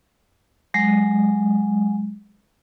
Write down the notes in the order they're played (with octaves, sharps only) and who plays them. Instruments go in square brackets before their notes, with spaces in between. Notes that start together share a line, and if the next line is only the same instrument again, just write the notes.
[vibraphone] F#3 G#3